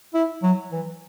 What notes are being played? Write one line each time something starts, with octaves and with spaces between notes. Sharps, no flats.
E4
F#3
E3